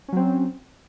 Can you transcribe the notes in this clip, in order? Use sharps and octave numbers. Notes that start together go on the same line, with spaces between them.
F#3 C4 C#4